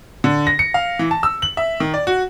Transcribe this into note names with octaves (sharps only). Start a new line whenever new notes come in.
D3
A#6
C#7
F5
E3
A5
E6
F#7
E5
D#3
D5
F#4